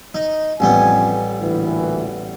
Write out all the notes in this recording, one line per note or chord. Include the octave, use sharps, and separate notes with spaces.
D#4
A1 F2 G3 B3 C#4 G#5
D2 A#2 E3